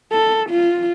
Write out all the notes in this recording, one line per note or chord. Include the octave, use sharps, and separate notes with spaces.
A4
F4